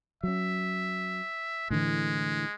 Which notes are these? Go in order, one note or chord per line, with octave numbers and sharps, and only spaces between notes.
F#3 C#4 E5
A2 D3 E3 G#3